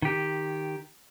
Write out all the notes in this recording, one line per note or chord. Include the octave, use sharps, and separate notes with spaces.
D#3 G4